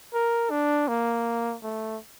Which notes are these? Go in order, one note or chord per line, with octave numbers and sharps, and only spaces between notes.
A#4
D4
A#3
A3